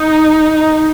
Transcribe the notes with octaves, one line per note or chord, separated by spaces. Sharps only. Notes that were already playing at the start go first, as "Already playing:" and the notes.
Already playing: D#4